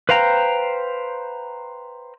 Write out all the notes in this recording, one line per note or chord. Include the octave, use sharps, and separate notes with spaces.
B4 C5 F5 G5 A#5